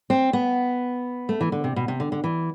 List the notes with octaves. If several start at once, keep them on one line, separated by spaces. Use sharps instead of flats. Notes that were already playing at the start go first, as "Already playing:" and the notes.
C4
B3
A3
E3
D3
C3
B2
C3
D3
D3
E3